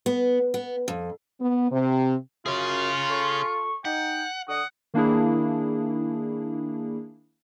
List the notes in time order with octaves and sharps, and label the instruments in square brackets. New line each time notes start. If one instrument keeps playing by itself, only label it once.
[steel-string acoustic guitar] B3
B3
F2
[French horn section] B3
C3
[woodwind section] F#2 [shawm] F4 [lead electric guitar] G#4 C#5
[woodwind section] A4 C#6
[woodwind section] D#4 [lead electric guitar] F#5 [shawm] G5
[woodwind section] D3 D5 D#6 [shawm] F#5
[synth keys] D#3 A#3 D4 E4 G#4